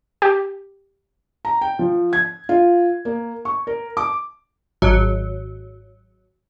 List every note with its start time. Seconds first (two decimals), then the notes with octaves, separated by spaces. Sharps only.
0.22 G4
1.45 A#5
1.61 G5
1.79 F3
2.13 G#6
2.49 F4
3.05 A#3
3.45 C#6
3.67 A#4
3.97 D6
4.82 G#1 F#3